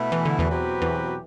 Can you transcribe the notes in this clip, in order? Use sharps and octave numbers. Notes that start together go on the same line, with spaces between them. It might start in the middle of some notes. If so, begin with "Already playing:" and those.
Already playing: B2 A3 E4
E3
D3
E2 E3
B2 F#3 C4 G4 B4
E2 E3